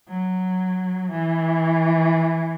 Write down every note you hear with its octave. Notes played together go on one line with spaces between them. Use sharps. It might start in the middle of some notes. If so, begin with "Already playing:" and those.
F#3
E3